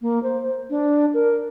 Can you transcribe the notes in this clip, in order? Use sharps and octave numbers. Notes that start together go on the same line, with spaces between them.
A#3
C5
D4
A#4